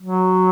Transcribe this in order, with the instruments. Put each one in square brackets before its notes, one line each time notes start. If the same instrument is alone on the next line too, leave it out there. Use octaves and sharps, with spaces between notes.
[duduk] F#3